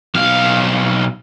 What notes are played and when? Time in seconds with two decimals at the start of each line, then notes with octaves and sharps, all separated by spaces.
0.15 B1 F5